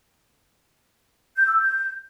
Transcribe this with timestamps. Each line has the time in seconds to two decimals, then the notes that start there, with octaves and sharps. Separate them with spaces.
1.37 G6
1.47 E6
1.58 G6